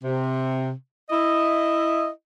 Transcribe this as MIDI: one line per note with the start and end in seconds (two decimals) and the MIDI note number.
0.04 0.71 48
1.10 2.07 64
1.10 2.07 75